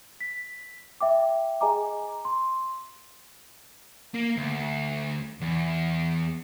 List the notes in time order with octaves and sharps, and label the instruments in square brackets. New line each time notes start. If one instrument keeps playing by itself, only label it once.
[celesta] B6
E5 G5 D6
G#4 D#5 G#5 A#5 D6
C6
[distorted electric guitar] A#3
D2
E2